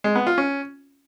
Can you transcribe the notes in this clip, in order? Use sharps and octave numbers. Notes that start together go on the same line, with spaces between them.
G#3
B3
F4
C#4